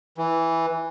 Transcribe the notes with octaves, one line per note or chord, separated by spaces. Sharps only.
E3